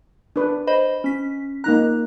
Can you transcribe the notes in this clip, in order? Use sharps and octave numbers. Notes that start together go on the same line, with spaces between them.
D4 B4
C5 D#5 B5
C#4 B6
A#3 D#4 A#5 F#6